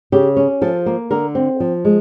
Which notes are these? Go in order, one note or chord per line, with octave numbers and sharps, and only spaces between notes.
C#3 G4
C#4
F3 A4
A#3
D3 A#4
C4
F3
G#3